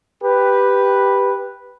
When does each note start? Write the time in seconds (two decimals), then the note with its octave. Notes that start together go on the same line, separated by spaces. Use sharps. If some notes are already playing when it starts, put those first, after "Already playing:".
0.23 G4 B4